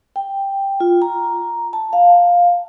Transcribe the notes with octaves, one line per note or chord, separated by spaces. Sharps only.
G5
F4
A#5
A5
F5